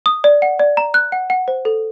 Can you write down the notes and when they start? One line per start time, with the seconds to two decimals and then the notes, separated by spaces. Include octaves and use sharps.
0.06 D#6
0.24 D5
0.42 F#5
0.59 D5
0.77 A#5
0.94 F#6
1.12 F#5
1.30 F#5
1.48 C5
1.65 A4